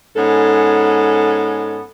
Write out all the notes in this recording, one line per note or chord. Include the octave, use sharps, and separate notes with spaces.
G#2 B3 C#4 A4